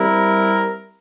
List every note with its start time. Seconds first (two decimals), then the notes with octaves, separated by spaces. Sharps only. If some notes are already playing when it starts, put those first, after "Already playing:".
Already playing: G3 C4 E4 A#4